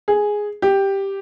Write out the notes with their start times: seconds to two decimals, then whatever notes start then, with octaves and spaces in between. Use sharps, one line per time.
0.08 G#4
0.62 G4